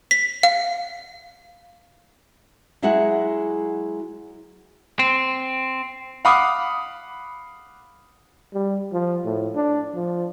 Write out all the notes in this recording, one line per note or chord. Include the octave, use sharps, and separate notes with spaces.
B6
F5
F#3 G#3 E4 F#4 G#4 F#5
C4
F5 F#5 B5 D6 D#6
G3
F3
A2
D4
F3